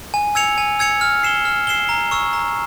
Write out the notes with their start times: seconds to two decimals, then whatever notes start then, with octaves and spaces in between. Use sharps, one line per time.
0.14 G#5
0.35 E6 G#6 C#7 F7
0.58 G#5
0.79 E6 G#6 C#7 F7
1.01 F6
1.23 C7 E7 G7
1.45 F6
1.67 C7 E7 G7
1.89 A#5
2.11 C#6 E6
2.33 A#5